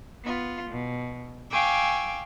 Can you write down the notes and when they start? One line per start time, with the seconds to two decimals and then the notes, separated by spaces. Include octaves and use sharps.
0.24 B3 F4
0.70 B2
1.50 F5 G5 G#5 C#6 D6 E6